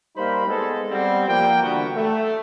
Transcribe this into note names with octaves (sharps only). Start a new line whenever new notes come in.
G3 A#3 D#4 C5 B5
G#3 B3 A4
G3 B3 C4
F3 A#3 G5
D3 E3 G3 A#3 B3 F#4
A3